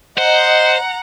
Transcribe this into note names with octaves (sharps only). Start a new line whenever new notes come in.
C5 D#5 F#5 A#5